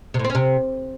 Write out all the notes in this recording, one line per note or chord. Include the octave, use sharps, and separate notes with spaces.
C3
A2
C4
C#4
C3